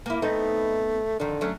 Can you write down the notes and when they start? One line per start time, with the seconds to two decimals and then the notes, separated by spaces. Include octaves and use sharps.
0.06 A#3 E4
0.22 A3 B3 C4 D#4
1.20 F2 D3 D#3
1.41 F#3 A3 C#4